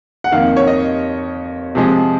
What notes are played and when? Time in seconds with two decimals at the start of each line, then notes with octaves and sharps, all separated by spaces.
0.24 F#5
0.31 F2 D#3 A#3 F5
0.57 C#5
0.67 D#5
1.75 C3 F3 G#3